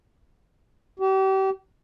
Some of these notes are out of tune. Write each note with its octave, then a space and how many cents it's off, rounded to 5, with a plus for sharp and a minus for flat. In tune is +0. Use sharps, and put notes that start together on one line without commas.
G4 -35